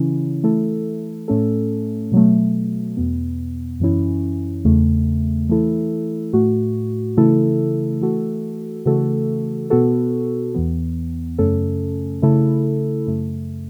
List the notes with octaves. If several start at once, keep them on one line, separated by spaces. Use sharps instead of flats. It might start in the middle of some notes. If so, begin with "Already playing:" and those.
Already playing: C#3 E3 C#4 E4
E3 A3 E4 A4
A2 A3 C#4 A4
B2 F#3 A3
E2 B2 B3
F#2 E3 C#4 E4
E2 C#3 A3
E3 A3 E4 A4
A2 A3 F#4
C#3 E3 A3 E4 A4
E3 A3 F#4 A4
C#3 E3 A3 F#4 A4
B2 B3 F#4 A4
E2 E3 B3
F#2 C#3 A3 C#4 A4
C#3 A3 E4 A4
F#2 C#3 A3